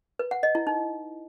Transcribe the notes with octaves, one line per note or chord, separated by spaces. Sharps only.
B4
F#5
D#5
E4
D#4